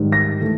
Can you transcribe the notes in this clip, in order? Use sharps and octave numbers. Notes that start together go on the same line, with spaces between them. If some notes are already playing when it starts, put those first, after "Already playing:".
Already playing: G#2 D#3 G3
A#6
E3 A3